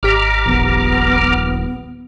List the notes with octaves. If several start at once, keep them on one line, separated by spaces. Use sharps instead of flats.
G#1 G4 A#5 D6 F6 B6
D#1 A#1 B3